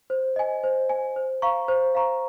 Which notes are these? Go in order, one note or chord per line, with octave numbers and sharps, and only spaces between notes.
C5
D#5 G#5
C5
D#5 G#5
C5
F5 A#5 C#6
C5
F5 A#5 C#6